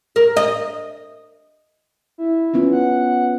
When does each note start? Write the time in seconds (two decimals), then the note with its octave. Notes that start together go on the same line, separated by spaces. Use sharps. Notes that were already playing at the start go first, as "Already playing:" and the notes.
0.16 A#4
0.37 D#5
2.18 E4
2.54 B3 C#4 F4
2.72 F#5